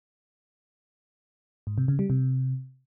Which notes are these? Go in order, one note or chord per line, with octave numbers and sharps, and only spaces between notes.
G#2
C3
C#3
G3
C3